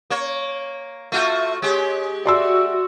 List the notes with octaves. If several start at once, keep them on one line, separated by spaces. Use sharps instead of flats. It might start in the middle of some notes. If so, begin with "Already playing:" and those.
A#3 C#5
A3 F4 F#4 E5
G#3 G4 C#5
F#4 D5 E5 C6 E6